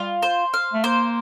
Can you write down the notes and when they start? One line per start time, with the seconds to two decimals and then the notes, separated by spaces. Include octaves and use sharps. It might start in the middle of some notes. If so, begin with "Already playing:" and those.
Already playing: G3 F4
0.22 C5
0.54 F5
0.74 A3
0.84 A#3 C5